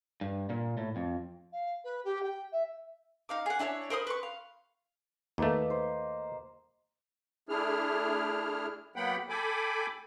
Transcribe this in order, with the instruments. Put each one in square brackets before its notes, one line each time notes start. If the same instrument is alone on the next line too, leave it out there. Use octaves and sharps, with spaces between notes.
[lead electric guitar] G2
A#2
A2
F2
[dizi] F5
B4
G4
G5
E5
[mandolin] D#4 F5 D6
G#4 F#5
D4 E4 B4 C#5
A#4 C5 B5 D#6
B4 C6 C#6
F5
[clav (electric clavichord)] D#2 A3 [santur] A#3 B4 D#5
[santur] C5
[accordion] A3 D4 E4 G#4 F6
F#3 A#3 B3 F#5 G5 B5
A4 G5 G#5 B5 D6